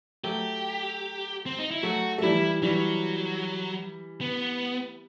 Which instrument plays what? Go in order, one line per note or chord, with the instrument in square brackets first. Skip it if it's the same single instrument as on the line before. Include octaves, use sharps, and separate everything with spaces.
[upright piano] F#3 A3 [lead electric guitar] G4
[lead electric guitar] C4
D#4
E4
[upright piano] F#3 A3 [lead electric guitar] F#4
[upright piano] A3
[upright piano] E3 G3 [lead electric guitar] E4
[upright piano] E3 G3 [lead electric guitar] F#3
[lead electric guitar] B3